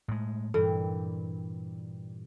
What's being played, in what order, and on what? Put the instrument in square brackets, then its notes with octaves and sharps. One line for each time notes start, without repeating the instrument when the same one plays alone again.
[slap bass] A2 G#3
[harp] G2 A#2 G3 [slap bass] E3 [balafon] A4